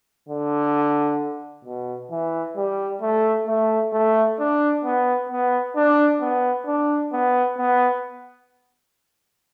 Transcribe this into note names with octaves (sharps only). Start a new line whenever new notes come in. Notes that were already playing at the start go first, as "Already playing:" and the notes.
D3
B2
E3
G3
A3
A3
A3
D4
B3
B3
D4
B3
D4
B3
B3